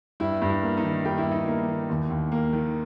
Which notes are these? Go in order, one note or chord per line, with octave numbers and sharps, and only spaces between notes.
G2 E4
G2
E4
A#3
D#4
D#3
G2 G4
E4
G2 D#4
A#3 E4
D#3
D#2
D#2
A#3
D#3